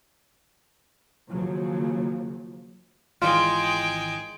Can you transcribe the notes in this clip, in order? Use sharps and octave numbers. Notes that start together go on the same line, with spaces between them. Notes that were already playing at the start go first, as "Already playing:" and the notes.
D#2 C#3 F3 F#3
G#1 D#3 E3 G#3 F4 G5